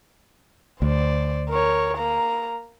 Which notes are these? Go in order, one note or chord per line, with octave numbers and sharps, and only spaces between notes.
D2 C5 D5
A#4 C#5
A#3 A#5